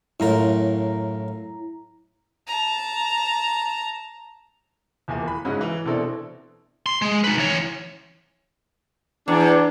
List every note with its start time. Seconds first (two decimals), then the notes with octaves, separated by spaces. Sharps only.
0.20 F#2 A2 E4 F4 A#5
2.47 A5 A#5
5.08 D#1 E2 A#3 G#5
5.28 B5
5.45 G#2 C#3 C#4 E4 F#4 G#4
5.61 E3
5.85 B2 E3 C4 D4 E4 A4
6.86 C6
7.02 G#3
7.24 D#4 B4
7.38 E3 C#5
9.28 E2 D4